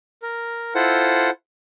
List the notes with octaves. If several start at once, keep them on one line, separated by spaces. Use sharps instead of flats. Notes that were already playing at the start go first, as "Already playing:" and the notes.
A#4
E4 F4 A4 C5 F#5